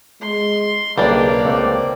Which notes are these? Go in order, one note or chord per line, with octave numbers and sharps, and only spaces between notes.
G#3 C6
B1 C#3 G3 A#3 D4 D5
C#2 A3 C4 F#5